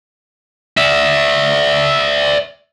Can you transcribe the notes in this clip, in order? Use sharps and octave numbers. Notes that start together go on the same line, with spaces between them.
D5 E5